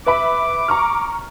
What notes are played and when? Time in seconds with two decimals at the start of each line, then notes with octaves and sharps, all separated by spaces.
0.06 B4 E5 B5 D6
0.68 A#5 C#6 F6